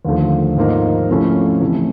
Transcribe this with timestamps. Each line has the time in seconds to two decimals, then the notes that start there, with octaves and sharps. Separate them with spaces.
0.05 D#2 D3 F3 A3
0.56 G#2 F3 A#3 D#4
1.09 C3 F3 A3 C#4 E4
1.61 C3 E3 A3